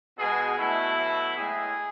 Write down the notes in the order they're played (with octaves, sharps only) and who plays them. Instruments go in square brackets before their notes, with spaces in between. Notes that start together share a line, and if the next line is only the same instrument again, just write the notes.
[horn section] B2 G#3 G#4
B2 A3 E4
B2 F#3 A3
A2 G#3 G#4